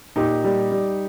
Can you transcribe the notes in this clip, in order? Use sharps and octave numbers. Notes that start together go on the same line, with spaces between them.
A#2 D#4 G4
G3
G3